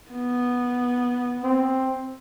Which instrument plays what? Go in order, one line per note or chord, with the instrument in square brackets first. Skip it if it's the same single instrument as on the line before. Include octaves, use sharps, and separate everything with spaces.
[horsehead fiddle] B3
[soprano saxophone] C4